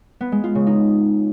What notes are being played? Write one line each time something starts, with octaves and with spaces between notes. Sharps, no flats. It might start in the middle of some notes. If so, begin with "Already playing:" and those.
B3
G#3
F4
C#3
D#4